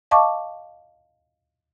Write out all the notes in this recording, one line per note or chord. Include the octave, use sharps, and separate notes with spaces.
D#5 F5 A5 C#6 D6